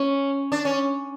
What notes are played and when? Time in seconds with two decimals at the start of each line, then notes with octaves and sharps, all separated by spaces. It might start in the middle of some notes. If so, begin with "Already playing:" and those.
Already playing: C#4
0.52 D4
0.65 C#4